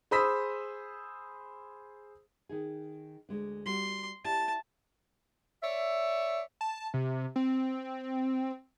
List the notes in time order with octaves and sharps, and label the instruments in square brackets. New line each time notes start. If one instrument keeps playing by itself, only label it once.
[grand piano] G#4 C5 B5 D#6 E6 B6
[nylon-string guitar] D#3 D#4 G#4
D2 G#3 D4
[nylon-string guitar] G3 F#4 [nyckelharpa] C6
[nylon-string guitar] E4 G4 D5 [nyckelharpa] A5
[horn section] C#5 D5 E5
[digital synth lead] A5
C3
C4